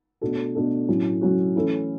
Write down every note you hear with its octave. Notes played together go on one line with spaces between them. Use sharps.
B2 A3 D4 F#4 A4
B2 A3 D4 F#4 A4
A2 F#3 C#4 F#4
A2 F#3 C#4 F#4
E3 A3 C#4 E4